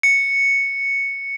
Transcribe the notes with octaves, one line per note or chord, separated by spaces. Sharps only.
C#7